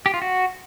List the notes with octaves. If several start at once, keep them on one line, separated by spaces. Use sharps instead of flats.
G4
F4
F#4